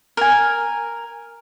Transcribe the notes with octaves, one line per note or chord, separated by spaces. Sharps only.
A#4 G#5